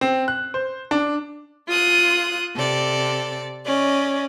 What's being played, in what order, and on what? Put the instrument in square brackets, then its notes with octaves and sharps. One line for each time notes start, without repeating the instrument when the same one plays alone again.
[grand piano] C4
F#6
C5
D4
[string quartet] F4 D#6 F#6
C3 A4 D5
C#4 D5 D#5